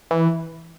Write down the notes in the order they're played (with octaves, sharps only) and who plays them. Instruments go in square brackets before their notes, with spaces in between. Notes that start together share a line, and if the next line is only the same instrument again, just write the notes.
[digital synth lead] E3